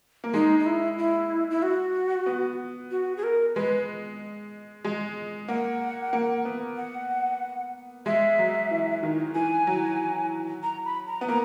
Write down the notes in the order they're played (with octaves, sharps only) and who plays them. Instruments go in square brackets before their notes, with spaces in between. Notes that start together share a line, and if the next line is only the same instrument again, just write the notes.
[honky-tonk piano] A#3
[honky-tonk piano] G#3 [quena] D#4
[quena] D#4
E4
E4
E4
F#4
[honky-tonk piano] B3
[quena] F#4
G#4
A#4
[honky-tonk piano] G#3 [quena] B4
[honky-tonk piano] G#3
[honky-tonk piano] A#3 [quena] F#5
[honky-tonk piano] A#3
B3
[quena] F#5
[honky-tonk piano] G#3 [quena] E5
[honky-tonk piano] F#3
E3
D#3
[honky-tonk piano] E3 [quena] G#5
[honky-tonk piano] F#3
[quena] A#5
B5
A#5
[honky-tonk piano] B3
[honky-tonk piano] A#3 [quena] A#5